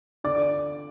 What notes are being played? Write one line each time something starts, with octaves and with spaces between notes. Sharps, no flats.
D3 D5 D6
D6